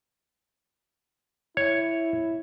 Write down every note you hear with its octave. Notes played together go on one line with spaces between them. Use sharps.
E4 C#5